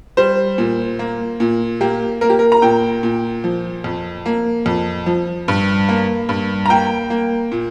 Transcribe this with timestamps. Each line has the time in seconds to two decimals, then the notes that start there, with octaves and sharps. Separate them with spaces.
0.17 G3 C5
0.58 A#2
0.99 A#3
1.40 A#2
1.81 A#3 G4
2.21 A#3 A#4
2.30 G4
2.39 A#4
2.52 A#5
2.62 A#2 G5
3.03 A#2
3.44 F3
3.84 F2
4.26 A#3
4.66 F2
5.06 F3
5.48 G2
5.89 A#3
6.29 G2
6.66 A#5
6.70 A#3 G5
7.10 A#3
7.52 A#2